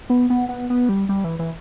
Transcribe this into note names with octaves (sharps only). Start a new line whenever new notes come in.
B3
B3
B3
B3
G3
G3
E3
E3